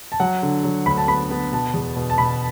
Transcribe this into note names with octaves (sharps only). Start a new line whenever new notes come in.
A5
F#3 F#5
D3
F#3
D2 B5
A5
B3 B5
B3
B2 A5
E2
B2
A5
B2 B5